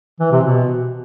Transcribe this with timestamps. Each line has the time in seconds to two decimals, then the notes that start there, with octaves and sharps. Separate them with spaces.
0.20 E3
0.32 C3
0.43 B2